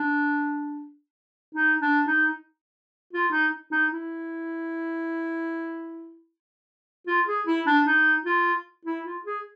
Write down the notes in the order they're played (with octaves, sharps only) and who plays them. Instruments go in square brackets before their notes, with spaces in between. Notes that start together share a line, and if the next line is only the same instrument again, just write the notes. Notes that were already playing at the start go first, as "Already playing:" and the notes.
Already playing: [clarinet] D4
D#4
D4
D#4
F4
D#4
D#4
E4
F4
G#4
E4
D4
D#4
F4
E4
F4
G#4